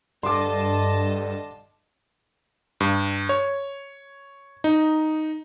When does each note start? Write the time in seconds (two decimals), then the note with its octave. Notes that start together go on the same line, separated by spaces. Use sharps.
0.23 G2 D3 D#5 A5 C6 D6
2.80 G2
3.29 C#5
4.64 D#4